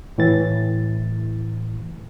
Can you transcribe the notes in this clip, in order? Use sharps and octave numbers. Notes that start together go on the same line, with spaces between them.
A2 E3 A6